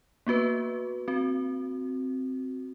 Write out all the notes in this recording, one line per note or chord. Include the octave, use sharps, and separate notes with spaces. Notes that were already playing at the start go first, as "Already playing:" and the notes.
A#3 B3 F#4 B4
C4 F#4